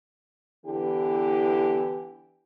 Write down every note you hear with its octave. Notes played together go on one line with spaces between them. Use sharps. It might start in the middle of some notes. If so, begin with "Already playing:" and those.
D3 E3 B3 E4 G4